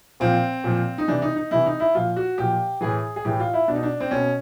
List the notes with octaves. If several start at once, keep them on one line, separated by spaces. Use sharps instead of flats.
A#2 F3 C4
A#2 F3
D#4
C3 E3 D4
D#4
D#4
C3 E3 E4
D#4
E4
A#2 F3 F4
F#4
A#2 F3 G4
A2 E3 G#4
G#4
A2 E3 G4
F4
E4
B2 D4
D#4
D4
C4
B2 C#4